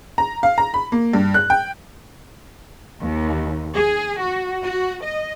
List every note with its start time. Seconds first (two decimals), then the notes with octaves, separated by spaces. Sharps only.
0.18 A#5
0.43 F5
0.58 A#5
0.74 B5
0.92 A#3
1.13 G2
1.34 F#6
1.50 G5
3.01 D#2
3.75 G#4
4.22 F#4
4.63 F#4
5.02 D#5